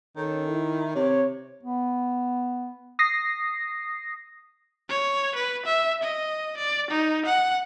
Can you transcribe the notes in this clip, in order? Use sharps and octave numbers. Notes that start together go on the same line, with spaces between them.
D#3 C#4 A4
E4
C3 C#5
B3
D#6 A#6 C7
C#5
B4
E5
D#5
D5
D#4
F#5